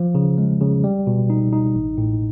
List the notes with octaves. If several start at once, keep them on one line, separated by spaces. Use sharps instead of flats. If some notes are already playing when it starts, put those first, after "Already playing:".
Already playing: F3
C#3
G#3
C#3
G3
B2
D#4
D#4
A1
A2